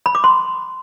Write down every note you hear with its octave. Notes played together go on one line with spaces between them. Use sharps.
B5
D6
C6